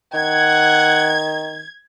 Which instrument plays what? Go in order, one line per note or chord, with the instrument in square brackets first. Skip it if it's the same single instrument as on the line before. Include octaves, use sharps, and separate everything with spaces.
[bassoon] D#3 [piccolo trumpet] F#5 [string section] G#6